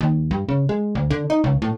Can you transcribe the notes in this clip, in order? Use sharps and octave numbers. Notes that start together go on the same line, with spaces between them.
D#2
G2
C#3
G#3
D2
D3
D#4
C#2
A2